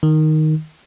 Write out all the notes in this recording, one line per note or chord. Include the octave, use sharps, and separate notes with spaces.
D#3